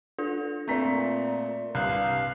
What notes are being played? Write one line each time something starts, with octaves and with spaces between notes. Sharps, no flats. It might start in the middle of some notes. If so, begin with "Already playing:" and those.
D4 F4 A4
A#2 A3 C4 B4 D5 A#5 B6
C2 G2 F5 F#6